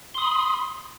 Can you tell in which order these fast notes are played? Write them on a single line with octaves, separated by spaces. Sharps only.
C6 D#6 B5